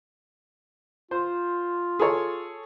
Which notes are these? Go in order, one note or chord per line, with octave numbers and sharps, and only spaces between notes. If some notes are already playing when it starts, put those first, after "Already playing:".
F4 C5
G#4 A4 C#5